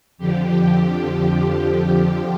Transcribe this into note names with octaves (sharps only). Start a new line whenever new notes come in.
F2 D3 F3 G4
G4